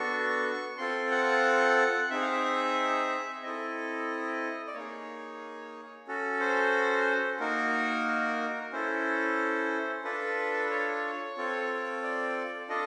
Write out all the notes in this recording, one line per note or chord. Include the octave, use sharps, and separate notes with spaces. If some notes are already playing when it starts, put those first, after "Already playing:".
Already playing: B3 D4 F#4 A4 C#6
C4 F4 A4 C6
F#5
C4 D#4 G#4 E5
F5
E5
C4 E4 A4 D#5
D5
A#3 D#4 G#4 C#5
C#4 F#4 A4
C5
A#3 D#4 F#4 A#4
C#4 E4 A4 C5
D4 F4 A4 B4
C#5
C4 F4 A4
D5
D4 F4 A4 D#5